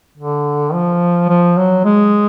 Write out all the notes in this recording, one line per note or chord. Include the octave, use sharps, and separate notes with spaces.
D3
F3
F3
F#3
G#3